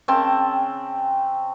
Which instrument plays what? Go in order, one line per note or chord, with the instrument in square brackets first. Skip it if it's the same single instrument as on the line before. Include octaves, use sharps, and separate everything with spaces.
[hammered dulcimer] C#3 C4 G5 A5